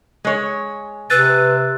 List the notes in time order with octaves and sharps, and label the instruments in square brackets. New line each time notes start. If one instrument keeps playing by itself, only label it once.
[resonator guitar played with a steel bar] G#3 C#5
[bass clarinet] C3 [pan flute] B4 [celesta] E6 F#6 A6